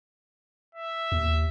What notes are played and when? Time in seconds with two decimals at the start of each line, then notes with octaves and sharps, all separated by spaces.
0.75 E5
1.12 D#2